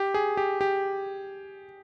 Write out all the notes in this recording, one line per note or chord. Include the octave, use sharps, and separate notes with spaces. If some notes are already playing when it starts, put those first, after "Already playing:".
Already playing: G4
G#4
G4
G4